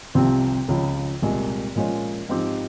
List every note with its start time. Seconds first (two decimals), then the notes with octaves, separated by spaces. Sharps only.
0.15 C2 C3 F3 C4
0.68 C#2 C#3 F3
1.22 C2 A#2 G#3
1.76 A#2 F3 G#3 C#4 F4
2.29 G#2 F3 C4 G4